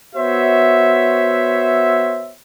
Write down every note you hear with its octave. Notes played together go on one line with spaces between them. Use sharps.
B3 F#4 C5 C#5 E5